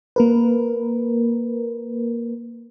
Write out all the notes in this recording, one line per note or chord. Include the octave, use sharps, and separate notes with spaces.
A#3 A#4 B4